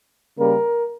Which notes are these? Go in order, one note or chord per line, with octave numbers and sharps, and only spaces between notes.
C#3 G3 A#3 A#4